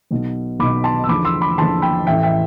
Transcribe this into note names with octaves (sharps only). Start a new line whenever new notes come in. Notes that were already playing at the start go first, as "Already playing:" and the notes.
B1 B2
B1 B2 B5 D6
A5 C6
E6
E2 D3 F3 B5 D6
C6 E6
B5 D6
E2 D3 F3 A5 C6
G5 B5
A1 A2 E3 E5 G5
E5 G5